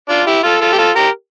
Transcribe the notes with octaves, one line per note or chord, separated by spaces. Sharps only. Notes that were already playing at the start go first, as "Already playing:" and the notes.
D4 F4
E4 G4
F4 A4
F4 A4
G4
F4 A4
G4 A#4